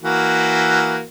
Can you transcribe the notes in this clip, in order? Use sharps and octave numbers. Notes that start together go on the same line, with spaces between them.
E3 A#3 F#4